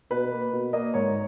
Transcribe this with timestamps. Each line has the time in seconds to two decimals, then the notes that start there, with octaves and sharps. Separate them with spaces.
0.10 B2 B4
0.31 A#3
0.52 B2
0.73 A#3 D#5
0.94 G#2 C#5